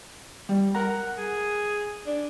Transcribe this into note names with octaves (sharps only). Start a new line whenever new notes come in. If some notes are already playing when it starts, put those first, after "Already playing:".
G3
A#4 F#5 A#5
G#4
D4